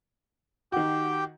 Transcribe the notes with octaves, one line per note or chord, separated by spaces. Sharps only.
D#3 F#4 G4 G5